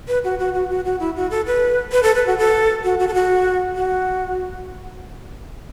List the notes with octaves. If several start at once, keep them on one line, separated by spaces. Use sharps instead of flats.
B4
F#4
F#4
F#4
F#4
F#4
E4
F#4
A4
B4
B4
A4
B4
F#4
A4
F#4
F#4
A4
F#4
F#4